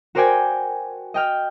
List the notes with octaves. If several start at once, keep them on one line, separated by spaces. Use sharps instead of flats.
F#4 A#4 C5 D5 G5 G#5
D#5 G5 F6